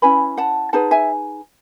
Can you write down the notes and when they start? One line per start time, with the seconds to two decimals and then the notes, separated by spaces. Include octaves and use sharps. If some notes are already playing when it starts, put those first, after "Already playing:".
0.02 C#4 E4 B4 G#5 B5
0.38 F#5 A5
0.73 D#4 G#4 B4 F#5 A5
0.91 E5 G#5